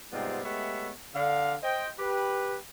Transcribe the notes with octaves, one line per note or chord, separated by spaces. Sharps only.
G#2 C3 G3 B3 C4 F4
G#3 A3 B3 G4 C#5 E5
D3 F5
C5 D#5 G5
G4 B4